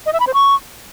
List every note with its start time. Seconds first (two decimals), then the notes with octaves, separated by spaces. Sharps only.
0.06 D#5
0.13 E5
0.20 B5
0.27 C5
0.34 C#6